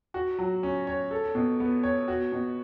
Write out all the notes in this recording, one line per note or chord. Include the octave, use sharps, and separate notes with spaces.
F#4
F#3
C#4
C#5
A4
B2
B3
C#5
F#4
B2